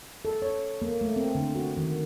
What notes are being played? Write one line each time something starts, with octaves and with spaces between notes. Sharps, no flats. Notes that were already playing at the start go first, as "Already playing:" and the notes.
A4
C#5
A#3
A3
C4
D3
F#4
D#3